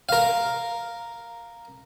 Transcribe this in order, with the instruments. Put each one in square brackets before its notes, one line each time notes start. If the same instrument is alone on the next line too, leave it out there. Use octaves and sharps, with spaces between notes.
[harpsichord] A#4 F5